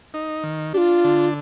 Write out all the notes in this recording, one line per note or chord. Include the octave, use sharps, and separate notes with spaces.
D#4
D#3
D4 F4 G4
D3